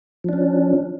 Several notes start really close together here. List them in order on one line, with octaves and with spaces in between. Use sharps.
F3 D4 C#4